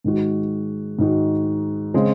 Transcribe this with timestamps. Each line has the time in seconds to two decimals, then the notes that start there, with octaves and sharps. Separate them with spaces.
0.04 G#2 D#3 G#3 D#4 F#4
0.99 G#2 D#3 G#3 D#4 F#4
1.94 C#3 G#3 C4